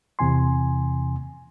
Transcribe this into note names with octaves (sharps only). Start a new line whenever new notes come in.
E2 C3 E3 G#5 C6